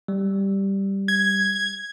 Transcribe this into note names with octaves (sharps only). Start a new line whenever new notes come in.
G3
G#6